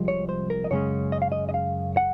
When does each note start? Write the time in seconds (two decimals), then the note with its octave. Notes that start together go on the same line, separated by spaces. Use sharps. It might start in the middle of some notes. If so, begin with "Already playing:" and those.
Already playing: C2 C3 F3 G#3
0.08 C#5
0.29 C5
0.50 A#4
0.64 D#5
0.70 F#2 C#3 G#3 C#4 C#5
1.12 D#5
1.22 F5
1.32 D#5
1.49 D#5
1.54 F5
1.97 F#5